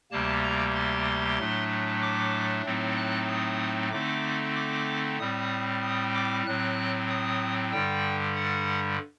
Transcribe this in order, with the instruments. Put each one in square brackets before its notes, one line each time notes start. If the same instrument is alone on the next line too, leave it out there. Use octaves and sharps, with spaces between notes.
[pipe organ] D2 C3 G3 A#3 A5
A#5
C6
A2 F#3 A3 D4
D6
A2 F#3 A3 C4 D#4
F#6
D#6
D3 A3 C4 D#4 D6
D6
A2 G3 C4 D#6
D#6
D6
A2 F#3 C4 F#6
D#6
G2 D3 G3 G5
F#5